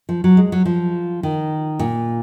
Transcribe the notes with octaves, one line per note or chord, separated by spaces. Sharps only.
F3
F#3
G#3
F#3
F3
D#3
A#2